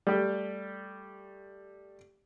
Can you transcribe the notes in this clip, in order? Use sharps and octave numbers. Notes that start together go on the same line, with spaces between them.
G3 A3 G4